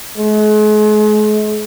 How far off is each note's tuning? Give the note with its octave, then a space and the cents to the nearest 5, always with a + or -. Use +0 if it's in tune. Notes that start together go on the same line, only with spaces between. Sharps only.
G#3 +40